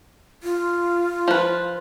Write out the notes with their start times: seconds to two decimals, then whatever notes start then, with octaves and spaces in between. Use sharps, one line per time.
0.43 F4
1.28 F3 B4